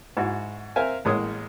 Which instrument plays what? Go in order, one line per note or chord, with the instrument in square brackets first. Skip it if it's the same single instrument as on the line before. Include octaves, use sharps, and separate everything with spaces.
[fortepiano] G#2 E4 F#4
C4 A#4 E5 F5 G#5
A1 A2 G#3 A#3 C#5 D#6